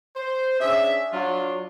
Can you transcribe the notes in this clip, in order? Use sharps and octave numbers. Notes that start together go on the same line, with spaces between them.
C5
C#4 D4 G#4 E5
F#3 D4 F4